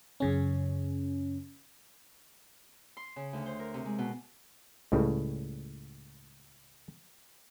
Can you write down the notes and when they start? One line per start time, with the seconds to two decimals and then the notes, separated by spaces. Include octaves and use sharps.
0.20 F#2 C#3 C#4
2.97 C6
3.16 C#3
3.33 D2
3.46 C5
3.60 A#4
3.74 C3
3.86 G#3
3.98 B2
4.92 C#2 A2 C#3 G3